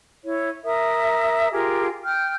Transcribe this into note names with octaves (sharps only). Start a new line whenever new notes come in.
E4 C#5
A#4 E5 D#6
F4 G4 G#4 A#4
G5 F6 G6